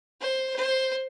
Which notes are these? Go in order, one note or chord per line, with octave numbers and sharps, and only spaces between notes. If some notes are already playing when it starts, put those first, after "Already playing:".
C5
C5